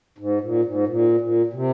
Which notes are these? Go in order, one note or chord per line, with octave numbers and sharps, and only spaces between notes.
G#2
A#2
G#2
A#2
A#2
A#2
C3